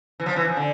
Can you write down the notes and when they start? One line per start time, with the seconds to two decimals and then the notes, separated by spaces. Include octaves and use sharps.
0.20 E3
0.26 F3
0.36 E3
0.47 F3
0.57 D3